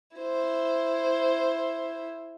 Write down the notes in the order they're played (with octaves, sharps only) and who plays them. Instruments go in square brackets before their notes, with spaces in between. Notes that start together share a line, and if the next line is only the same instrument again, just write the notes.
[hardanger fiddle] E4 C5